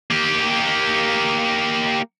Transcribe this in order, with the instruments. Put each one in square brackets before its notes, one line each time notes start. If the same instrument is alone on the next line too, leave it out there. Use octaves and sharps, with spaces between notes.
[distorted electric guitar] A#3 G4